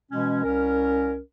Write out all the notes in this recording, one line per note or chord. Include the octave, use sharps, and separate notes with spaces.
B2 E3 G#3 C#4
C2 C#4 A#4